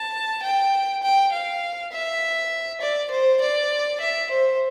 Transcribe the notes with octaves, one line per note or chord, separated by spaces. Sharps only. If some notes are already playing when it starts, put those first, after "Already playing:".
Already playing: A5
G5
G5
F5
E5
D5
C5
D5
E5
C5